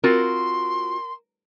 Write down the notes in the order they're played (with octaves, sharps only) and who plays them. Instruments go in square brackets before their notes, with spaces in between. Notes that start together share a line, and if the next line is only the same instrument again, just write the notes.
[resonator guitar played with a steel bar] C4 F4 F#4 [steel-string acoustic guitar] A#4 [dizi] C6